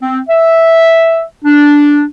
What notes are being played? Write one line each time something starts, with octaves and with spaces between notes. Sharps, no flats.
C4
E5
D4